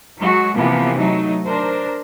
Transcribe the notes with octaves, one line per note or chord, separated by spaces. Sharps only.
F#3 G#3 F#4
C3 E3 F3 A#3 B3
F#3 A3 D#4
D4 A#4 C5